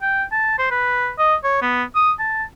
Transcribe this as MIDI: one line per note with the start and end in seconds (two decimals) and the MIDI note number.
0.02 0.23 79
0.32 0.54 81
0.58 0.68 72
0.71 1.10 71
1.18 1.35 75
1.44 1.60 73
1.62 1.83 59
1.95 2.12 87
2.19 2.43 81